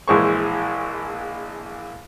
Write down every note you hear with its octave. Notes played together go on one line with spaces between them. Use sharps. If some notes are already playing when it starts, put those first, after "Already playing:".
A#1 E3 G#3 C5 C#6